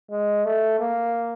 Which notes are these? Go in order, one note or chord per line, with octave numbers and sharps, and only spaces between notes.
G#3
A3
A#3